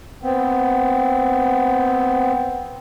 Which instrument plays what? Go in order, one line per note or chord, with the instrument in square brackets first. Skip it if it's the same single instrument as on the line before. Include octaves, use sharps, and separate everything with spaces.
[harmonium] B3 C4